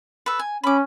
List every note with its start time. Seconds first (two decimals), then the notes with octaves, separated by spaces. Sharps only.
0.26 A4 B4
0.39 G#5
0.64 C#4 B5 D6